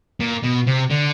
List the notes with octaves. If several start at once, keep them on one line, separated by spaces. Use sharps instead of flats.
A#2
B2
C3
D3